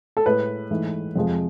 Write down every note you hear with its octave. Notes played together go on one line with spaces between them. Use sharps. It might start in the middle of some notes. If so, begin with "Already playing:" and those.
A4
A2 G#3 B4
G#2 E3 A3
F2 C3 F3 G#3